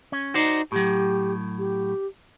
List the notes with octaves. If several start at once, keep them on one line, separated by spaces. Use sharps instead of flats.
C#4
D#4 F#4 C5 D5
A2 F#3 G4
G4